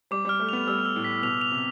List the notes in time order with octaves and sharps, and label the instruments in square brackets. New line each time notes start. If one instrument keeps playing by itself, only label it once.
[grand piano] G3 [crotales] D6
[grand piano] G3 [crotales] F6
[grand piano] A3
[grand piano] B3 [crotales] F7
[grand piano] G3 [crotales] E6
[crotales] E6
[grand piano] A2
[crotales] B6
[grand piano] B2 [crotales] F7
[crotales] F7
[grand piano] C3